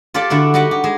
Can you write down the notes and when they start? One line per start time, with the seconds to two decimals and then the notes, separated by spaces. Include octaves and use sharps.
0.14 F4 G4 A4 D5
0.30 D3 E4 F#4 D5
0.54 G3 D#4 F#4 G4 F#5
0.71 G4
0.84 G#3 G#4